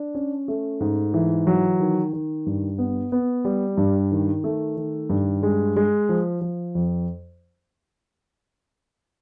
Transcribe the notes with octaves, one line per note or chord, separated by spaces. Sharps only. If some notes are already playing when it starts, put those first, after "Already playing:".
Already playing: D4
C#4
A3
G#2
E3
F#3
D#3
D#3
G2
B3
B3
G3
G2
D#3
A3
D#3
G2
G#3
G#3
F3
F3
F2